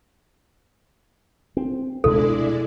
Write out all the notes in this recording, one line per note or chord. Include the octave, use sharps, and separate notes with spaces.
C4
D2 B2 G#3 D4 E4 A4 D5